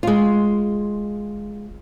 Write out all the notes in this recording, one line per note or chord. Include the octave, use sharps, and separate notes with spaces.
G#3 F4